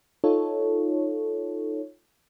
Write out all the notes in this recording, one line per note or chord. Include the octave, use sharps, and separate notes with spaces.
D#4 F4 A4 C#5